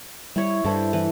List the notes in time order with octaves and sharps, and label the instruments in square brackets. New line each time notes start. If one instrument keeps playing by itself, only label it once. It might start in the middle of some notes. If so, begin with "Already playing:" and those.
[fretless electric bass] G3 [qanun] E4 C#5
[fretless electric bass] G2 [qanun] E4 A4 C5
[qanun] E3 B4